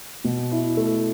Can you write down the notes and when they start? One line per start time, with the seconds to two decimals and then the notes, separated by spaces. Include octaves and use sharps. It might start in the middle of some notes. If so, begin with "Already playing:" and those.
0.24 B2
0.51 E4
0.77 A3